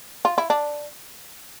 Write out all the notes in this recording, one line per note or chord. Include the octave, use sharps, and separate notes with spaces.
F4
E4
D4